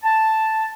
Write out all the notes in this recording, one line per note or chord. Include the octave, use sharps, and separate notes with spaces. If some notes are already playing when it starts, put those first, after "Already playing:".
A5